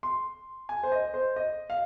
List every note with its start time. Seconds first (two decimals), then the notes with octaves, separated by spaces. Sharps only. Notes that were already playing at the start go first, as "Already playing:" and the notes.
0.03 C6
0.69 G#5
0.83 C5
0.92 D#5
1.14 C5
1.36 D#5
1.70 F5